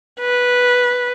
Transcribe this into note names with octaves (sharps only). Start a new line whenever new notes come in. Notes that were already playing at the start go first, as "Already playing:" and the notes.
B4